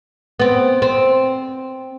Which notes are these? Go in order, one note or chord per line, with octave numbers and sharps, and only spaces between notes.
B3 C4
C4